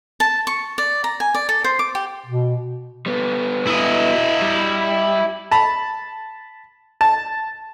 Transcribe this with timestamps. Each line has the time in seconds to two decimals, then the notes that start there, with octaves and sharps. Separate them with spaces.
0.20 A5
0.47 C#6
0.78 D5
1.04 A#5
1.20 G#5
1.34 D5
1.49 A4
1.64 C5
1.79 D6
1.95 G4
2.26 B2
3.06 G3 B3
3.67 E4 D#5
4.42 G3
5.51 A5 B5
7.01 A5